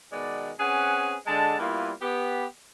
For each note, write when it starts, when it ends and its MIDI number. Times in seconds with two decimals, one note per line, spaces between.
0.12 0.51 47
0.12 0.51 51
0.12 0.51 56
0.12 0.51 59
0.12 0.51 74
0.60 1.16 60
0.60 1.16 61
0.60 1.16 68
0.60 1.16 71
0.60 1.16 78
0.60 1.16 80
1.27 1.58 50
1.27 1.58 56
1.27 1.58 81
1.59 1.91 46
1.59 1.91 55
1.59 1.91 58
1.59 1.91 59
1.59 1.91 64
1.59 1.91 65
2.02 2.45 59
2.02 2.45 67